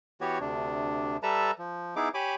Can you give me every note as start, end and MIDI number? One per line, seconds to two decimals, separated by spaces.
0.21 0.38 52
0.21 0.38 59
0.21 0.38 66
0.21 0.38 67
0.21 0.38 73
0.40 1.17 38
0.40 1.17 48
0.40 1.17 62
1.23 1.51 55
1.23 1.51 69
1.23 1.51 71
1.23 1.51 76
1.23 1.51 81
1.23 1.51 82
1.59 1.95 53
1.96 2.09 59
1.96 2.09 63
1.96 2.09 64
1.96 2.09 68
1.96 2.09 86
2.14 2.35 67
2.14 2.35 73
2.14 2.35 80
2.14 2.35 83
2.14 2.35 86